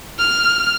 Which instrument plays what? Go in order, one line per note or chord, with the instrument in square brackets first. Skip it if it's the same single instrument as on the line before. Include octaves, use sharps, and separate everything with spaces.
[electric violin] F6